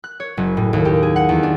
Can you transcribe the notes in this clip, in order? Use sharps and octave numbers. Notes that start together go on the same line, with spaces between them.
F#6
C#5
F#1
A2
D#2
G4
G#4
F#5
E2
D4